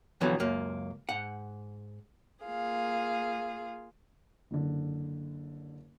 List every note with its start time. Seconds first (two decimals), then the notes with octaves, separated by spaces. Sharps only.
0.21 F2 B2 D3 E3 F#3 B3
0.40 C#2 F#2 A#3
1.09 G#2 F#5
2.45 A#3 F4 G#4 F5
4.51 F#1 D3